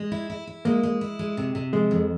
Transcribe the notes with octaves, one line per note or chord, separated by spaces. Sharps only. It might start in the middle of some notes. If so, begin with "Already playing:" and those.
Already playing: G#3
E4
E4
E4
G#3 A#3
G#3
E4
G#3
C3
C3
F3 G#3
F2